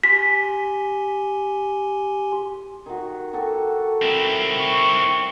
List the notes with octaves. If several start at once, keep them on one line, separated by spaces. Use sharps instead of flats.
G4 G#5 C6 B6
D#3 F#4
F#4 G4 A4
C4 E4
C#6